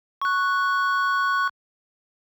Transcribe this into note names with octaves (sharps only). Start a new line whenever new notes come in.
C#6 F#6